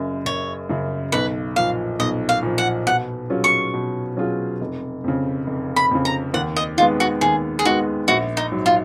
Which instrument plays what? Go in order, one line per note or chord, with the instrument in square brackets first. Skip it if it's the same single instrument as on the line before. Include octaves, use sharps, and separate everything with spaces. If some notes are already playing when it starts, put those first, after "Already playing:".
Already playing: [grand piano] F#1 F#2 C#3
[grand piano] F#1 [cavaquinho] C#5
[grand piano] F#2 C#3
[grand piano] B1 [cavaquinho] B4
[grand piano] A#2 F3 [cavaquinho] F5
[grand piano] B1 [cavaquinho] D#5
[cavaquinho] F5
[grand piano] A#2 F3
[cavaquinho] F#5
[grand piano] B2 [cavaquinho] F#5
[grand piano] F#3 C#4 F4 G#4
[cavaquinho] C#6
[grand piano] B2
F#3 C#4 F4 G#4
F1
F2 C#3
F1
[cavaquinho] B5
[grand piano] F2 C#3
[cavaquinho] A#5
[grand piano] D#2 [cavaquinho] F#5
[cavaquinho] D#5
[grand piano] D#3 G#3 B3 [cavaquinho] F4
[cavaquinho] F#4
[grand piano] D#2 [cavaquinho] G#4
[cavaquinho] G#4
[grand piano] D#3 G#3 B3 [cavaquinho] F#4
[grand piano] A#1 [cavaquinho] F#4
[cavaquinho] D#4
[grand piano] G#2 F#3
[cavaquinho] F4